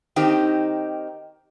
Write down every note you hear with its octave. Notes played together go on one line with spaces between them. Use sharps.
D#3 C4 D#4 G4